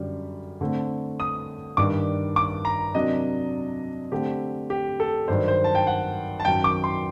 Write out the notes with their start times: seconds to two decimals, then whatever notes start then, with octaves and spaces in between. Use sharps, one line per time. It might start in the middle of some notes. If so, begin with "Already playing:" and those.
Already playing: F#2 D3 G3
0.61 D3 A3 C4
1.20 D#6
1.77 G2 D#3 G3 D4 D6
2.36 D6
2.65 A#5
2.94 C3 F#3 A#3 D4 D#5
4.12 D3 A3 C4 G4
4.70 G4
5.00 A4
5.28 G2 D#3 F#3 C5
5.48 C5
5.64 A5
5.75 G5
5.87 F#5
6.40 A5
6.45 F#2 D#3 F#3 G5
6.64 D6
6.84 C6